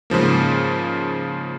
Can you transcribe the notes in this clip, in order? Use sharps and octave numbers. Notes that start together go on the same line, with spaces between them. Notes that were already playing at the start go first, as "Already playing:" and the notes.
G#2 C#3 F3 A#3